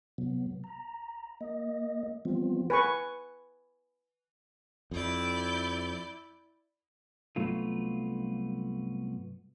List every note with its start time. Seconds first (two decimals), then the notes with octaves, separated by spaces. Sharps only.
0.18 C3 F#3 B3
0.64 A#5
1.41 A#3 D#5
2.25 E3 F3 G3 B3 C4 F4
2.70 B4 G#5 C#6
4.91 F2 E4 D5 G6
7.36 C2 G2 F#3 A3 B3 F4